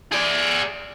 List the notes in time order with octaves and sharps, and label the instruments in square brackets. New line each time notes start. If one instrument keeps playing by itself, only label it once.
[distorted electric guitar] G#4 D5